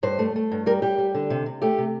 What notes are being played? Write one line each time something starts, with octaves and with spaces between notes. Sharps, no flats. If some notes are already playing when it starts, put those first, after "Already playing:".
G2 C5
A3
A3
G2
G3 A#4
G3 G4
G3
D3
C3
C3
A3 G4
C3